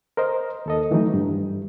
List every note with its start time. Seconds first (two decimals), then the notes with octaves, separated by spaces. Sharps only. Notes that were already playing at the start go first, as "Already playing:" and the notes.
0.17 A#4 C5 D#5
0.66 D#2 A4 D#5
0.91 D#3 E3 F#3 A3 D#4
1.14 G2